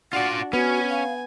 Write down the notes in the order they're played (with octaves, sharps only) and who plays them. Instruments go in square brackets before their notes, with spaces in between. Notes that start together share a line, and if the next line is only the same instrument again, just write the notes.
[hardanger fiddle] D4 F#4 [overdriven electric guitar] F4 D5 [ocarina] F#5
[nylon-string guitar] B3 [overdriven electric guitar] C#4 [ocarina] F#4 [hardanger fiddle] G#5
[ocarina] F5